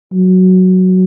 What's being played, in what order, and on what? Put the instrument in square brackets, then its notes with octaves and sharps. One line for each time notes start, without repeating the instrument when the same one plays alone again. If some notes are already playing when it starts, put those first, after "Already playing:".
[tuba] F#3